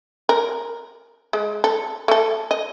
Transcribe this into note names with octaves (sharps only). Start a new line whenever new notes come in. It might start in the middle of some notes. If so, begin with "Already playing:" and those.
A#4
G#3
A4
A3 A4
D#5